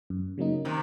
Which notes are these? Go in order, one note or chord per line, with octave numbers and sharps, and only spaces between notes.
F#2
C#3 F#3 A#3 D#4
C3 D#3